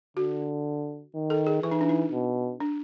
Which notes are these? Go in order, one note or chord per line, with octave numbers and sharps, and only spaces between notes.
D3 F#4
D#3
A4
G#4
E3 E4
D#4
D4
D#4
B2
D4